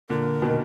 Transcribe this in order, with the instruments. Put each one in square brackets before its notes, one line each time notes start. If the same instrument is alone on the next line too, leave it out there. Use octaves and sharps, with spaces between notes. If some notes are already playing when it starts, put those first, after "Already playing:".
[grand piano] A#2 D3 [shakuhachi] A#4
[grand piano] B2 D#3